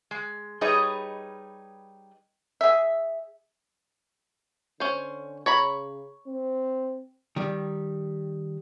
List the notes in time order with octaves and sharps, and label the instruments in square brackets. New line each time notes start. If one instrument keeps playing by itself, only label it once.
[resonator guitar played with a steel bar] G#3
G3 D#4 G#4 B4 C#5 D#5
[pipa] G#4 E5
[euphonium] D3 [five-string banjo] C#4 C5
[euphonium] C#3 [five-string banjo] C#5 A#5 B5
[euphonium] C4
[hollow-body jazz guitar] D#3 G3